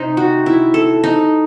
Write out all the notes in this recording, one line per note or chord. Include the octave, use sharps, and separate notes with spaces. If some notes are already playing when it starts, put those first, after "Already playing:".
Already playing: C3 D#4 C5
F#4
E4
A4
D#4